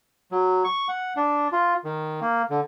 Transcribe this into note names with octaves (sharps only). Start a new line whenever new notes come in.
F#3
C#6
F#5
D4
F4
D#3
A#3
D3